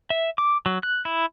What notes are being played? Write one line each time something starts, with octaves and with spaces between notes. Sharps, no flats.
E5
D6
F#3
F#6
E4